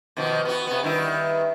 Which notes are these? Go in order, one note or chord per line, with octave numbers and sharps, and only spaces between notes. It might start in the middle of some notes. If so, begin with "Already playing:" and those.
B2 D#3 F3
B3 F#4
C3 B3
G2 D#3 E4